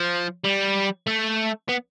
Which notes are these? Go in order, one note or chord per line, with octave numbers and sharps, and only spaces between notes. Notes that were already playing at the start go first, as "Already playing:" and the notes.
Already playing: F3
G3
A3
B3